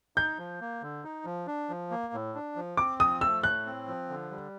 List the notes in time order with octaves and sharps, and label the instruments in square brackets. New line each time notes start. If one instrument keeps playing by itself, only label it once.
[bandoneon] D#4 [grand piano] G6
[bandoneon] F3
A#3
D3
D#4
F3
D4
F3
A#3
A2
D4
F3
[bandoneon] C4 [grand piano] D6
[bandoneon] F3 [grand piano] D#6
[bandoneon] A3 [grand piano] E6
[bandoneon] A2 [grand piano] F#6
[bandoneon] C4
F3
D3
G3